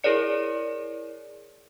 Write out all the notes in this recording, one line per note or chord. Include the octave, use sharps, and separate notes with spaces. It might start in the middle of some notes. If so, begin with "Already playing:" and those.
E4 G#4 A#4 C#5 D5 C#7